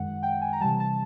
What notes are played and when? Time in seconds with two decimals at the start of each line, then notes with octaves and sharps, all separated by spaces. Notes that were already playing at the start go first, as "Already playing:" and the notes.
Already playing: F#2 D#3 G#3 F#5
0.23 G5
0.42 G#5
0.53 A#5
0.61 C3 E3 G3 A5
0.80 A5